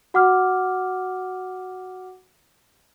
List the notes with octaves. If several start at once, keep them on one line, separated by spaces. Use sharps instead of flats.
F#4 F#5 D6 F6